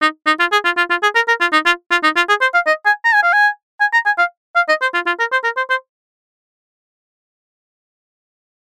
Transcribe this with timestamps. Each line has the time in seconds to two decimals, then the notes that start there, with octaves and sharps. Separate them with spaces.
0.02 D#4
0.26 D#4
0.40 F4
0.52 G#4
0.65 F4
0.77 F4
0.90 F4
1.02 G#4
1.15 A#4
1.28 A#4
1.41 F4
1.53 D#4
1.66 F4
1.91 F4
2.03 D#4
2.16 F4
2.29 G#4
2.41 C5
2.54 F5
2.67 D#5
2.85 G#5
3.04 A#5
3.14 G#5
3.23 F5
3.33 G#5
3.80 G#5
3.93 A#5
4.06 G#5
4.18 F5
4.56 F5
4.69 D#5
4.81 C5
4.94 F4
5.06 F4
5.19 A#4
5.32 C5
5.44 A#4
5.57 C5
5.70 C5